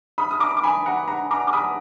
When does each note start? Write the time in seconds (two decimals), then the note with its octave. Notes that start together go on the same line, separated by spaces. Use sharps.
0.18 B5 D#6
0.31 D#6
0.40 A#5 D6
0.57 D6
0.63 G#5 B5
0.86 F#5 A#5
1.08 F#5 A#5
1.31 A#5 D6
1.47 D6
1.53 B5 D#6